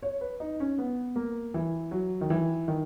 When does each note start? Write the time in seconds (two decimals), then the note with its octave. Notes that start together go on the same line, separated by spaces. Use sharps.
0.03 C#5
0.21 B4
0.40 D#4
0.60 C#4
0.78 B3
1.16 A#3
1.54 E3
1.91 F#3
2.21 D#3
2.30 E3
2.68 D#3